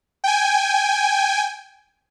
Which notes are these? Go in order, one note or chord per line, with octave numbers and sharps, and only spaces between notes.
G5 G#5